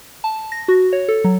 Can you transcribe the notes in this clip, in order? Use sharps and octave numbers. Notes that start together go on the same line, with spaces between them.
A5
A#6
F#4
C#5
A4
F#3